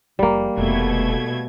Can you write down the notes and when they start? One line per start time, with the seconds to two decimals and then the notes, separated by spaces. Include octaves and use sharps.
0.19 F#1 F3 G3 A#3
0.57 F1 B2 A3 G#6